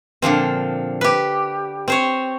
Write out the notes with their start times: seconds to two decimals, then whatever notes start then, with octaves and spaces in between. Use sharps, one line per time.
0.22 A#2 D3 F3 C4
1.01 G4 B4
1.88 C4 C5 C#5